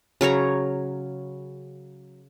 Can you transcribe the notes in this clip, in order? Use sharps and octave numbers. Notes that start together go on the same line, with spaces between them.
C#3 F#3 C#5 A#5